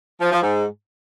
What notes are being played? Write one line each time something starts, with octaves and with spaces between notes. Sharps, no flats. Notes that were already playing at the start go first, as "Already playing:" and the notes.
F3
F3
G#2